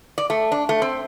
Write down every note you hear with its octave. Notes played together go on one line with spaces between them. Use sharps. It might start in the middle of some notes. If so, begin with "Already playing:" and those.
D5
A3
D4
A3
C4